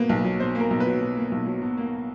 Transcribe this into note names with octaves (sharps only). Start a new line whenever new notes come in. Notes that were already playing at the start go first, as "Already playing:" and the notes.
Already playing: B2 A#3 B4
B1
F#3
B2 C5
A#3 A#4
B1
B4
F#3
B2
A#3
B1
F#3
B2
A#3